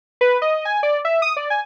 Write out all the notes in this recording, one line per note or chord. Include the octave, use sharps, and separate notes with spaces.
B4
D#5
G#5
D5
E5
D#6
D5
G#5